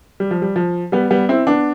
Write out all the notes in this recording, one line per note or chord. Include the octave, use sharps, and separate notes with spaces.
G3
F3
G3
F3
G3 B3
G3 B3
C4 E4
B3 D4